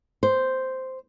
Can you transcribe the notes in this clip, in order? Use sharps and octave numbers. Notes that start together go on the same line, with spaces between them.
C5